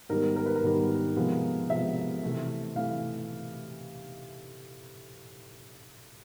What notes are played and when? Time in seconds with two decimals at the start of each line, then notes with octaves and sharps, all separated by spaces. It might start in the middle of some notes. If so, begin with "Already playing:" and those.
0.09 G#2 D#3 G3 B3 A#4
0.36 A#4
0.46 B4
0.56 A#4
0.63 G#2 D#3 G3 B3
1.16 C3 F3 G#3 B3
1.70 C3 F3 G#3 B3 E5
2.23 C3 E3 A3
2.76 C3 E3 A3 F5